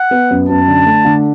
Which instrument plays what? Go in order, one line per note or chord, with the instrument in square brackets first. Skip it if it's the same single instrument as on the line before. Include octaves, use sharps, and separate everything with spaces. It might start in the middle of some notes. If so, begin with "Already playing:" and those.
Already playing: [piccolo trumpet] F#5
[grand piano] B3
F#2
[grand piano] F#2 [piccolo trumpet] A5
[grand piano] D3
A3
D3